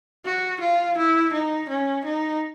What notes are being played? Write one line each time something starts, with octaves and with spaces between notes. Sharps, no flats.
F#4
F4
E4
D#4
C#4
D#4